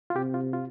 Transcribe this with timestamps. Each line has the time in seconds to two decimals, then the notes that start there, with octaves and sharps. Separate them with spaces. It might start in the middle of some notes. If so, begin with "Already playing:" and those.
0.10 F4
0.16 C3 G4
0.34 F4
0.53 F4